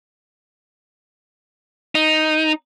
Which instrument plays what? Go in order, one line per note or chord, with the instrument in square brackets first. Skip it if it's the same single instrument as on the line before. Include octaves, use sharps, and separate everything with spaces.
[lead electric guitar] D#4